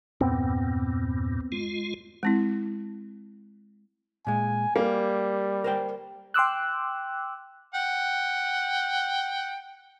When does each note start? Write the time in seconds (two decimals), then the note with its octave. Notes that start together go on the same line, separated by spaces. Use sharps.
0.21 E2 G2 A#2 B3 C4
1.52 G#3 F4
2.23 G#3 C4 E4
4.27 A#2 G#3 G#5
4.76 G3 A#3 F5
5.64 A#4 C5 G5
6.34 G5 C6 D6 E6 F#6
7.75 F#5 G5